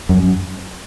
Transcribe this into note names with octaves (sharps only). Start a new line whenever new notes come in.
F#2